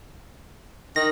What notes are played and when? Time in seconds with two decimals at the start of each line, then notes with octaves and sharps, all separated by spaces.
0.96 D#3 A#6